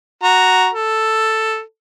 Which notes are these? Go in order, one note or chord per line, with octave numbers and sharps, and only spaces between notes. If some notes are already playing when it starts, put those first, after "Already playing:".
F#4 A#5
A4